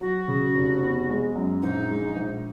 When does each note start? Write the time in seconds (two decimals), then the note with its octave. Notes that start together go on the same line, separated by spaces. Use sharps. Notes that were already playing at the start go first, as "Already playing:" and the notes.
0.01 F#3 F#4
0.28 C#3
0.55 F1
0.82 B3
1.09 G#3
1.36 F#2
1.62 A#1 D#4
1.90 G#3
2.16 A#1